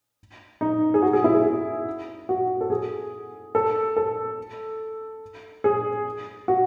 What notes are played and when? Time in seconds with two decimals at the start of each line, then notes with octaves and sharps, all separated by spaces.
0.61 D#4
0.94 G#4
1.02 F#4
1.13 G#4
1.24 E4
1.34 G#4
1.45 G#4
2.29 F#4
2.61 A4
2.70 G#4
3.55 A4
3.96 A4
5.64 G#4
6.48 F#4